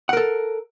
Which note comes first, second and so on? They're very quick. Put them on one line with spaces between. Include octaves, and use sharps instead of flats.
F#5 A#4 A4